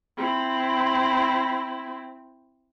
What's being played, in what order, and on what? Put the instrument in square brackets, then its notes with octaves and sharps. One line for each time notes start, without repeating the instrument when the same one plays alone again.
[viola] C4 E4